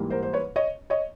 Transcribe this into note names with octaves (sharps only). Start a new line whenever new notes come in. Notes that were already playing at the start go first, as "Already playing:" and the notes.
Already playing: G#2 E3 G3 A#3
A#4 C5
C5
B4 C#5
C#5 D#5
C#5 D#5